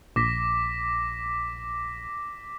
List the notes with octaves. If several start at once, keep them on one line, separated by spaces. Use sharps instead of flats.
A#1 D6 A#6 B6